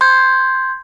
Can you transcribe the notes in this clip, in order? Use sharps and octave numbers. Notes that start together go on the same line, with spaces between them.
C6 G6 G#6